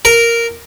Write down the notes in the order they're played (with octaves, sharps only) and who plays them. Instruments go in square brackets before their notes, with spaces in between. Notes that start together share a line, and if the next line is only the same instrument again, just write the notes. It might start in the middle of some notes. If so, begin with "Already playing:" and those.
[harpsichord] A#4